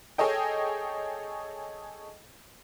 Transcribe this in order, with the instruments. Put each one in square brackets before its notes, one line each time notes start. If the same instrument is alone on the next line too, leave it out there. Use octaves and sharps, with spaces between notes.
[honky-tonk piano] G#4 A4 C#5 D#5 G5